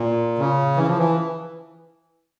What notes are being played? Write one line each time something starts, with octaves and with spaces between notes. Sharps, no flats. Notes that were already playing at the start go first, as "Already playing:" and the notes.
Already playing: A#2
C#3
E3
F3
E3